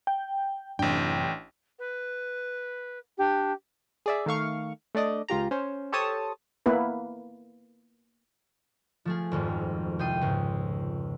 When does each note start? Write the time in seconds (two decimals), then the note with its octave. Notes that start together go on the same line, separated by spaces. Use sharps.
0.07 G5
0.79 A1 F#2 A2 C3 D4 G5
1.79 B4
3.18 D4 G4
4.06 G#4 D5 E5
4.26 D#3 A3 F5 C#6
4.95 A3 D4 D5 D#5
5.28 C#2 F4 G4 A#5
5.51 C#4 C5
5.92 G4 A4 C5 C#5 A5 D#6
6.66 A#3 B3 E4 B4
9.05 F3 A3 G#4
9.31 D#1 G#1 F2
9.99 C2 G5 D#6 C7 D#7
10.21 C#2 G#2